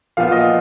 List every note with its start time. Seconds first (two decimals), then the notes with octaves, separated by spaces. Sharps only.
0.17 A#2 F3 B3 F5
0.32 D#5